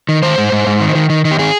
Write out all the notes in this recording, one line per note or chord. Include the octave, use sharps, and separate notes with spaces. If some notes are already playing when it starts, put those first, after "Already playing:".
D#3
D#3 C5
G#2
G#2
G#2
D#3
D#3
D#3
D#3
G4
D#3 G#4